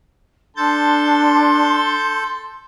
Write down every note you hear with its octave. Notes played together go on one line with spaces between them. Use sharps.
D4 A4 C6 G6 A6